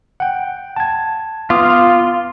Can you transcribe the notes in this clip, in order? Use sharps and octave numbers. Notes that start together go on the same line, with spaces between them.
F#5 G5
A5 G#6
B3 F4 D6 D#6